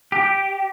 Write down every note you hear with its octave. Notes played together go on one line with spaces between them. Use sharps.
G4